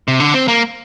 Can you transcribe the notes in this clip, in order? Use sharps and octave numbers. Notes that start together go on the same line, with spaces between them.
C3
D3
C4
A#3